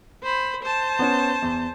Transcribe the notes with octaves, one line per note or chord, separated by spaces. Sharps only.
C5 B5
C5 A5
B3 C#4
E2